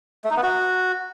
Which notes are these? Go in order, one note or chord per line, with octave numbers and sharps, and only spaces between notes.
A3
D#4
B3
F#4